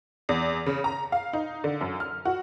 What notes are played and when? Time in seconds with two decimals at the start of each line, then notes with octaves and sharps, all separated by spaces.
0.29 E2
0.66 C#3
0.84 A#5
1.12 F5
1.33 D#4
1.64 D3
1.81 F#2
2.00 F6
2.25 F#4